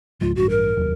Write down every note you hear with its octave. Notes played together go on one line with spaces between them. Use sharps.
C#2 G#2 F3 F4
A1 G2 F#4
A#4
F1 D#2 F#3